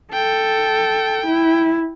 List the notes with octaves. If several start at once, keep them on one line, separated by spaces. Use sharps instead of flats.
A4 G5
E4